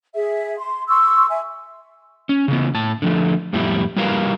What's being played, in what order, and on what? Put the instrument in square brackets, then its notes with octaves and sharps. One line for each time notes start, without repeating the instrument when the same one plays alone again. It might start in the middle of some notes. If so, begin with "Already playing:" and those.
[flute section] G#4 E5
C6
C6 C#6 E6
E5 G#5
[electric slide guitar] C#4
C#3 E3 B3
A2 A5
D3 F3 A3
F2 A2 G3 B3 E4
G3 E4 F#4 A#4 B4 F5